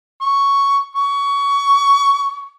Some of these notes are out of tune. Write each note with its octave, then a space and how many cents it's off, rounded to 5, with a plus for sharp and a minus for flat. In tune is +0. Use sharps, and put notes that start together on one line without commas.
C#6 +5
C#6 +25